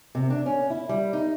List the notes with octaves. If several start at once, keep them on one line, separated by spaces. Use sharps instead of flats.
C3
D4
C#4
E4
G3
D#4